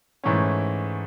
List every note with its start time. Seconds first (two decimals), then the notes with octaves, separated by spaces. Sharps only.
0.24 G#2 E3 A3 C#4